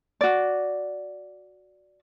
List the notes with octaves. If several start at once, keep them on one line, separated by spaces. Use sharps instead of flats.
F#4 D5